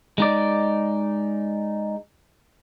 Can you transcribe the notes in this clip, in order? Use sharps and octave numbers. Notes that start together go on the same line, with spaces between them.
G#3 D#4 D5